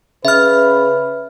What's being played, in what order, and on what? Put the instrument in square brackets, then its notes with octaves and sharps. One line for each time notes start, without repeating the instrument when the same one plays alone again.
[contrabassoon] C#3 [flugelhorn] B4 [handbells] E5 F6